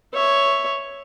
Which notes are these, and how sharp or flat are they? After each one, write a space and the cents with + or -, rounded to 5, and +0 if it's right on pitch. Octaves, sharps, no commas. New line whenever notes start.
C#5 +0 E5 +0